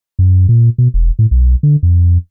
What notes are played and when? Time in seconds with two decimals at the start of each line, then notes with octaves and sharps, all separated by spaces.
0.19 F#2
0.49 A#2
0.78 B2
0.94 E1
1.19 A2
1.31 B1
1.63 D3
1.83 F2